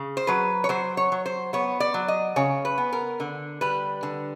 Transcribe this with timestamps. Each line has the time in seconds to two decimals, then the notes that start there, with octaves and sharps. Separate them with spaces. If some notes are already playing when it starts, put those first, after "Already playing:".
Already playing: C#3
0.17 C5
0.27 F#3 B4
0.64 C#5
0.69 F#3 C5
0.97 C#5
1.12 F#3
1.26 C5
1.53 B3 C#5
1.80 D5
1.94 F#3
2.08 D#5
2.36 C#3 C#5
2.65 B4
2.78 B3
2.93 A#4
3.20 D3
3.61 G3 B4
4.03 D3